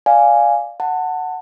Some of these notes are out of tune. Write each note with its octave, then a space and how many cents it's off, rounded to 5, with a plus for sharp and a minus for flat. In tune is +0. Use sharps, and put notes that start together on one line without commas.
D5 +0 F5 +0 G#5 +0
F#5 +0 A5 +25